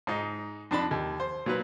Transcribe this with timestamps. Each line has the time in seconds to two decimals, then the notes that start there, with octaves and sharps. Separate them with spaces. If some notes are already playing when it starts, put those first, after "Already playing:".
0.07 G#2 D#4
0.71 F2 D4 A5 B5
0.91 D#2
1.20 C5
1.46 A#2 F#3 B4